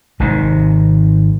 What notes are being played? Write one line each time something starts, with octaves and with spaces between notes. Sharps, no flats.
G#1 G#2 C3 D#3